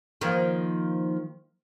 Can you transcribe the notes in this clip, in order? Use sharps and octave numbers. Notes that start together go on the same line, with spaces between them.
D#3 F3 A#3